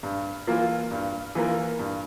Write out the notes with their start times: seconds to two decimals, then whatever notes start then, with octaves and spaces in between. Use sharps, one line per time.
0.03 G2
0.47 E3 A#3 F4 A#4
0.91 G2
1.35 E3 A#3 F4 A#4
1.79 G2